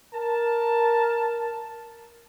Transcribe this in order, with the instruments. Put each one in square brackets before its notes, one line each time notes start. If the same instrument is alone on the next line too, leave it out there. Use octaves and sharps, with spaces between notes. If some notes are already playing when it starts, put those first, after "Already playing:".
[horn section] A#4 A5